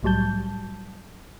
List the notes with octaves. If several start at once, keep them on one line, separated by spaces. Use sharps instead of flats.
C2 A2 F#3 G3 A5 G6